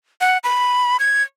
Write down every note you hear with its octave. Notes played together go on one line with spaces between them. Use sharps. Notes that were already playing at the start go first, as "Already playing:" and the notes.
F#5
B5
G#6